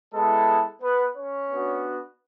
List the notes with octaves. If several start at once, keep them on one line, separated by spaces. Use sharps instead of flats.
G#3 B3 E4 A4
B3 B4
C#4 C#5
B3 D4 F#4